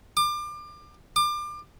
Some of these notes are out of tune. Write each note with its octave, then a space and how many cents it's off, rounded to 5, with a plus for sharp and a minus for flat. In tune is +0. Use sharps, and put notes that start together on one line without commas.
D6 +30
D6 +30